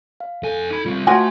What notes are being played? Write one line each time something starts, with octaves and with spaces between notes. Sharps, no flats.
F5
F2 A4 G#5
D#4 B5
G3 C4 F4 F5
F3 A3 F#4 G#5